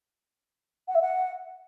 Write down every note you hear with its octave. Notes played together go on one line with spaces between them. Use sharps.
F#5
E5
F#5